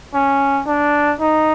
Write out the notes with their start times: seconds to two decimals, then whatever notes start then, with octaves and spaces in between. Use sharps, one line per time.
0.14 C#4
0.67 D4
1.20 D#4